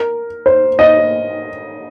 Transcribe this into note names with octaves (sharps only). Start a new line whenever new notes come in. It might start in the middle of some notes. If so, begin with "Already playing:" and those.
Already playing: A#4
C5
D#5